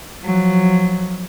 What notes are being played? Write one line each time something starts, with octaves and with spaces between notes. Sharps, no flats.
F3 F#3